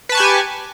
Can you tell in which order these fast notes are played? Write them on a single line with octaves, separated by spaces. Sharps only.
B4 A5 C#6 G#5 G4